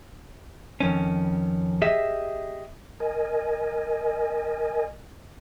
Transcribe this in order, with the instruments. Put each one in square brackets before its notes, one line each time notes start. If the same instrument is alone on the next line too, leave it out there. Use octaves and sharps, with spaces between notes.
[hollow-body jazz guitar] F2 D#3 C#4
G4 G#4 D#5 E5
[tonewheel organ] A#4 D#5 G#5